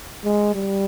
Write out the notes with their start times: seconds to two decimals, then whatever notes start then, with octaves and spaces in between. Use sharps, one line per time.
0.24 G#3
0.54 G3